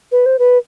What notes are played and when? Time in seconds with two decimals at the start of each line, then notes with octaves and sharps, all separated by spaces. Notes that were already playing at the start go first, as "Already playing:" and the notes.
0.12 B4
0.26 C5
0.39 B4